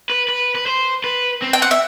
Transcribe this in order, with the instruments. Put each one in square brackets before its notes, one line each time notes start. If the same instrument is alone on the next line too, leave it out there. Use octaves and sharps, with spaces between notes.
[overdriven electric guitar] B4
B4
B4
C5
B4
C4
[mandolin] G5
F#5
E5